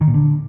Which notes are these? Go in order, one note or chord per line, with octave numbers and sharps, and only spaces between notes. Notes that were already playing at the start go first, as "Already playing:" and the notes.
D#3
A#2
D3